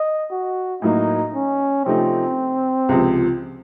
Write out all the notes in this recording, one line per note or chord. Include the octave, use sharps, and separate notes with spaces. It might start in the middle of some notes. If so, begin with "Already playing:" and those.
Already playing: D#5
F#4
A2 F#3 A#3 D#4
C#4
C3 F3 A3 C4 D#4
C#2 C3 F3